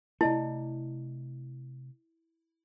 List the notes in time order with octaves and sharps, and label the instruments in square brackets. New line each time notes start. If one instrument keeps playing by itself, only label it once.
[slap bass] C3 A3 [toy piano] E4 [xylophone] D5 D#5 A5